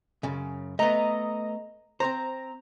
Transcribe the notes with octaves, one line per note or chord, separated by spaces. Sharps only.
F#2 C#3
A3 B3 D#5 A#5
C4 C5 A#5